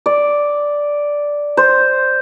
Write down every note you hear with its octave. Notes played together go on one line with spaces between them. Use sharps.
D5
C5